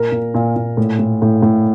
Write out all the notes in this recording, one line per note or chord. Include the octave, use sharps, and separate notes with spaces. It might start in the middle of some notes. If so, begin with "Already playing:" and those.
Already playing: A#2 A#4
A#2
A#2
A#2
A2
A2
A2
A2